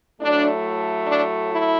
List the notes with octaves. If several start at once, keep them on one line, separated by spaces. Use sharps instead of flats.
A2 F#3 A3 D4
D4
E4